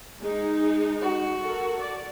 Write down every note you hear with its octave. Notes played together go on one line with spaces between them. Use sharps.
G#3 D#4
F#4
A4 A#4
D5